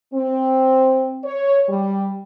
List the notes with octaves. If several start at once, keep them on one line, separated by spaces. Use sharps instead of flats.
C4
C#5
G3